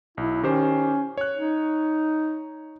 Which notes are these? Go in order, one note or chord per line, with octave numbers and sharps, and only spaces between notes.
B1 E4
D#3 C#4 G4 C5
C#5 F#6
D#4